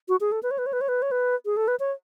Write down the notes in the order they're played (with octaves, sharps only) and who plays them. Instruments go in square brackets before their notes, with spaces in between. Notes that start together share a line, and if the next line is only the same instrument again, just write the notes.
[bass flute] F#4
G#4
A4
B4
C#5
B4
C#5
B4
C#5
B4
C#5
B4
G#4
A4
B4
C#5